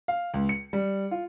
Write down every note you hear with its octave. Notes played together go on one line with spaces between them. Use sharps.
F5
C#2
C#7
G3
F4